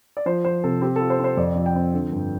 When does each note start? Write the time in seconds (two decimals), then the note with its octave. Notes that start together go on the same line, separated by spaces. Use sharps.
0.17 D5
0.26 F3 C5
0.45 F3 C5
0.64 C3 A4
0.81 C4 G4
0.96 F4 A4
1.10 C5
1.19 C4
1.24 C5
1.37 F2 D5
1.56 F3
1.66 G5
1.75 C4
1.94 D3
2.12 G2